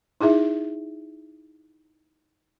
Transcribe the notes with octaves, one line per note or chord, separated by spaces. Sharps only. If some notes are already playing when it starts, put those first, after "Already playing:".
D#4 E4 G#4 E5